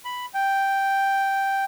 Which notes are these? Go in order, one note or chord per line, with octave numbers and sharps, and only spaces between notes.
B5
G5